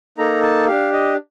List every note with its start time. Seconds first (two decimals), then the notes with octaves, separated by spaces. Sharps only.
0.18 A#3 D#4 A4 A#5
0.42 A5
0.67 D4 G4 F5
0.93 D#5